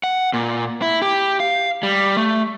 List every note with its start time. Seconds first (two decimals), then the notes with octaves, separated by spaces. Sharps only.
0.04 F#5
0.33 A#2
0.82 E4
1.02 G4
1.40 F5
1.83 G3
2.17 A3